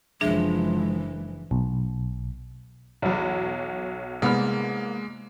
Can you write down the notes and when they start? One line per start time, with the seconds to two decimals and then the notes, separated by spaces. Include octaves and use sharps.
0.21 F#1 E3 F3 G#3 D4 G#4 E5
1.51 B1
3.02 B1 E2 F#3
4.22 C2 G#3 A#3 B3 F6